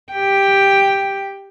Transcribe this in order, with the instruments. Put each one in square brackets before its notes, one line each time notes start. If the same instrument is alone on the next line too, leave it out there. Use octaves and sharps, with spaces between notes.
[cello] G4 G5